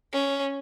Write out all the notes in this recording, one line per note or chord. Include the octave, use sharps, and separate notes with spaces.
C#4